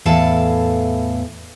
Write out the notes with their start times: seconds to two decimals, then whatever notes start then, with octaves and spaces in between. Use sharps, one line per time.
0.05 E2 A2 A4 F5 A5